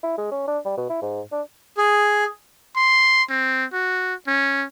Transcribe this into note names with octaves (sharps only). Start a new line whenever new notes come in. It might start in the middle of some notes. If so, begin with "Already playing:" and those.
E4
G#3
C#4
D4
G3
B2
E4
G#2
D4
G#4
C6
C4
F#4
C#4